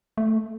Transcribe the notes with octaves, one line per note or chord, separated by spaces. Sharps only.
A3